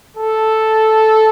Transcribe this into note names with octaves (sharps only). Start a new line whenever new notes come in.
A4